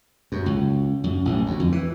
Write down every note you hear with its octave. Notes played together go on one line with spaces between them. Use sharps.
F#2
C#2
F#2
A1
D2
F2
E3